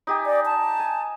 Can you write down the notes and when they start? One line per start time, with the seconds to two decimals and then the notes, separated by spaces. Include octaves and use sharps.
0.07 D#4 G4 G#5
0.26 D5
0.46 A5
0.79 G#5